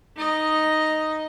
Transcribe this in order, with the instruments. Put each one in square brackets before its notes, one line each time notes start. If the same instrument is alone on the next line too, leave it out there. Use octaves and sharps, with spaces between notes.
[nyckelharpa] D#4 D#5